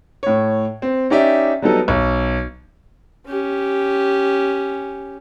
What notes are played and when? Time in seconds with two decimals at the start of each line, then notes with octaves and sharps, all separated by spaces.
0.23 A2 C#5
0.82 C4
1.10 C#4 D#4 G4 D5 E5
1.62 F#3 G3 B3 D#4 A4
1.88 B1
3.27 C#4 G4